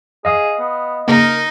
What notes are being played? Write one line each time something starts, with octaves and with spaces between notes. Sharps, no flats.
G#4 D#5 F5 D#6
B3
C#3 A#3 D#4 A#4